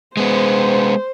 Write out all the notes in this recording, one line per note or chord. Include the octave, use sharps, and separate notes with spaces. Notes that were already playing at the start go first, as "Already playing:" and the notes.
G#3 B3 C5